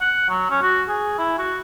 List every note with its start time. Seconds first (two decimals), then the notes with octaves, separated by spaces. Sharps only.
0.01 F#5
0.29 F#3
0.50 C#4
0.62 F#4
0.89 G#4
1.19 E4
1.38 F#4